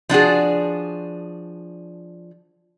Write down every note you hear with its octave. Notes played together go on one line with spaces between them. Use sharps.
F3 D4 F#4 G#4